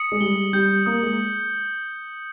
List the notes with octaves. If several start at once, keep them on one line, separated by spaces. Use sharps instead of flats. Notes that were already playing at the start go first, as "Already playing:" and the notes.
Already playing: D#6 C#7
G#3
G3 G7
G3 G6
A#3 D#6
G#3